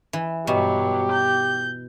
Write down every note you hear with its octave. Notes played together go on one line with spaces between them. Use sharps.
E3
G2 B2 F#3 G4
G6